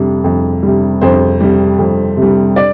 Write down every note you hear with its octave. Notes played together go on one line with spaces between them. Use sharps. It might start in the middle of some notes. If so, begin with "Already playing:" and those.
Already playing: F2 C3 G3
F2
C3 G3
F2 C5
C3 G3
F2
C3
G3
D5